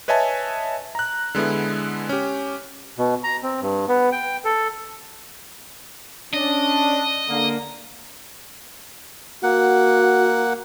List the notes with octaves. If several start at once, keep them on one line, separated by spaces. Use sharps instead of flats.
B4 C#5 D#5 E5 G#5 A5
A#5 F#6
D3 G#3 B3 E4
C#4 G4
B2
A#5
C4
G2
B3
G5
A4
C#4 D4 D#5
D3 A#3
A#3 F#4 F#5